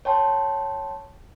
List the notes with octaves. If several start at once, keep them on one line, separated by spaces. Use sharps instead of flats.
C#5 G5 A5 C6